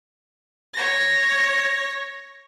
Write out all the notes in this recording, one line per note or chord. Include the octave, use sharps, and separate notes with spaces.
C#5 A#6